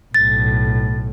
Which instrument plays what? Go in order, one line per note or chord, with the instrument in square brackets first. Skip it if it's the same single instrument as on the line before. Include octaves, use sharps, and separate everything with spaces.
[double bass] B1 A2 [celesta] A6